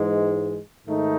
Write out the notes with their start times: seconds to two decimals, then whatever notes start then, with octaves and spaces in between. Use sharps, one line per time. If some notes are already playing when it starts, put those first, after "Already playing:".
Already playing: G#2 E3 G#3
0.87 G#2 D#3 A3 D#4